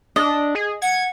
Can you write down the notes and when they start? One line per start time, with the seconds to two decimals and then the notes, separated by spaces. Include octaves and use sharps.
0.16 D4 D#5
0.55 G#4
0.82 F#5 G#6